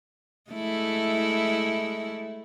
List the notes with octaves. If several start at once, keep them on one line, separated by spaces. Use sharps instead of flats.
G#3 A3 E4